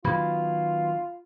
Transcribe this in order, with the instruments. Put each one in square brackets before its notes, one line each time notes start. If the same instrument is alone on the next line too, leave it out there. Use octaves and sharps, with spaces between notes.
[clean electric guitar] D#3 F#3 B3 [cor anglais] F4 [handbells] B5 G#6